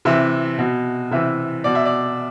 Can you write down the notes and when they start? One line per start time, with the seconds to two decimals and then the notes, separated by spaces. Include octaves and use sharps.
0.05 C3 E3 E5
0.58 B2
1.11 C3 E3 E5
1.64 B2 D5
1.75 E5
1.85 D5